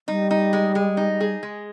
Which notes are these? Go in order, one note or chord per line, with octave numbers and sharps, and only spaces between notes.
G3 D#4
D#4
G#3
G#3
D#4
G#4
G#3